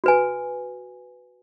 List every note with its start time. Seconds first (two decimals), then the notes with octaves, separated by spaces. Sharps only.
0.04 F#4 B4 G#5